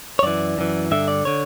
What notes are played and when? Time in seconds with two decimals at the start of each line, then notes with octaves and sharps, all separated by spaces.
0.19 C#5
0.23 F#2 E3 D5
0.58 F#2 E3
0.91 G2 D3 E5
1.08 D5
1.25 D3 C#5